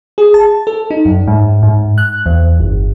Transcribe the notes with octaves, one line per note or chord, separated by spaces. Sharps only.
G#4
A5
A4
D#4
F#2
G#2
G#2
F#6
E2
G1